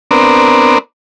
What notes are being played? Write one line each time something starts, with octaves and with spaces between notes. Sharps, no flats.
B3 C4 D4 A#4